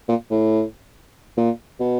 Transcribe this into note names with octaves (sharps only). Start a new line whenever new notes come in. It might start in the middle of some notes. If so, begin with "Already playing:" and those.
A#2
A2
A#2
B2